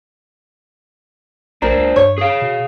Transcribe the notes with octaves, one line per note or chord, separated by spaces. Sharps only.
A#1 D4 A#4 C5
C#2
G2 C#5
G#4 F5
B2